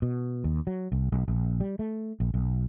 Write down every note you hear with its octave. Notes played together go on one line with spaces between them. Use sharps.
B2
D#2
F#3
C2
B1
A#1
G3
A3
A#1
B1